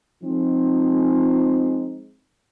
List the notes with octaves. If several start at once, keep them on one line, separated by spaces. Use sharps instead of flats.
F3 G#3 C4 D#4